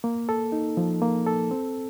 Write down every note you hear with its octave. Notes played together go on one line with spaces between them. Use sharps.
A#3
A4
D#4
F3
A#3
A4
C4